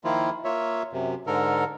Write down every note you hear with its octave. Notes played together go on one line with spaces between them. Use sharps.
D#3 F3 A#3 E4 F4
A#3 F4 C#5 E5
F#2 C3
G#2 D3 A4 A#4